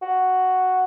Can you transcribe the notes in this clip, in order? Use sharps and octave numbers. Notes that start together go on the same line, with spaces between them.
F#4